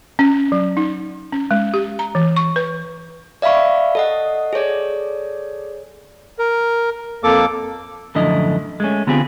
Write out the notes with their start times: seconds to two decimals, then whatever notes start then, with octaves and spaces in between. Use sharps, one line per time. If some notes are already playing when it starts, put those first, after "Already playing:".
0.19 C#4
0.52 F#3
0.77 D#4
1.32 C#4
1.51 G#3
1.74 G4
1.99 A#5
2.15 E3
2.37 C#6
2.56 B4
3.42 D5 E5 F5 B5 C#6
3.95 A4 D#5 F#5
4.53 G#4 A4 C#5 D5
6.39 A#4
7.24 F2 A#3 A4 D6
8.15 F#2 A2 D3 F3 E4 D#5
8.80 G#3 A3 C#4
9.07 D3 B3 C4 F4 G4 G#4